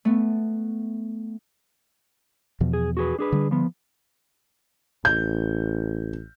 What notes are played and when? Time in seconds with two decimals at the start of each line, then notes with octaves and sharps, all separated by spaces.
0.05 A3 B3
2.60 E2 B2 F3
2.73 G#4
2.97 F#4 G#4 B4
3.19 D4 G#4 B4
3.32 D3 G3
3.51 F3 B3
5.05 A1 G6